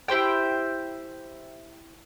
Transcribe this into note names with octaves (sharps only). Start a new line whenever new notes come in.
E4 G4 C5 G5